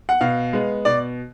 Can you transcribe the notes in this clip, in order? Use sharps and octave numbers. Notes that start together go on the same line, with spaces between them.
F#5
B2 F5
G#3 B3
B2 D5